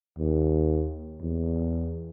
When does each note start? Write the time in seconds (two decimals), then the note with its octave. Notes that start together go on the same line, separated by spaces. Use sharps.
0.18 D#2
1.21 E2